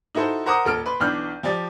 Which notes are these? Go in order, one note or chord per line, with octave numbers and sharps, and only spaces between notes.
D#4 E4 F#4 A4 C5
A#4 C5 F#5 A#5 D6 D#6
D#1 A4 F6 D7
B4 B5 C6
B1 E3 D4 F6 G6
F3 G4 D5 A6